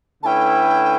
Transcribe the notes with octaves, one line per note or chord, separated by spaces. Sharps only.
D3 A3 C#4 E4 B4 G5 A5